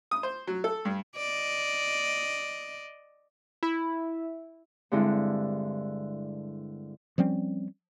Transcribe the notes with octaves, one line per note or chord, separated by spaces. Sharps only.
D#6
C5
F#3
A4
G2
D5 D#5
E4
G2 D3 G#3 C4 E4
F3 G3 C4 C#4